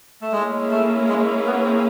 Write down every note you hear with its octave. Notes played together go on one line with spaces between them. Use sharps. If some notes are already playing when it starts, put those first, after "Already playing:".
A3
G#3 A#3 C#4 E4 G#4
A3
G#3
B3
C4